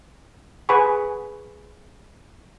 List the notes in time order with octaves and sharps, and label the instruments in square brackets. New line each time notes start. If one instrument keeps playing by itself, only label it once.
[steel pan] G#4 B4 F#5 G#5 B5 C#6